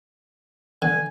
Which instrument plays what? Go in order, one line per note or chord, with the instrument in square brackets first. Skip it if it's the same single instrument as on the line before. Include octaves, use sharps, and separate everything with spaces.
[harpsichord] D3 [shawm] G#5